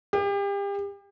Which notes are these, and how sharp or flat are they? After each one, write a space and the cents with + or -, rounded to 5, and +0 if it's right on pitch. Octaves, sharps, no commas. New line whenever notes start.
G4 +35